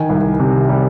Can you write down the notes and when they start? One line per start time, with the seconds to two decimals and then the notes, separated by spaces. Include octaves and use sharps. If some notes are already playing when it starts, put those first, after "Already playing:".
Already playing: D#3 G#5
0.09 C2
0.39 C3
0.69 G3